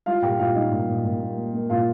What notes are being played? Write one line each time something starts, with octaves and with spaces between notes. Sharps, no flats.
G3 F4 F5
A#2 G4 G5
A#2 F4 F5
G3 D#4 D#5
A#2
A#2
A#2
A#3
A#3
A#3
A#2 F4 F5